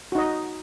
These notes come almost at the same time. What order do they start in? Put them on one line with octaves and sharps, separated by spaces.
F#4 D#4 D#5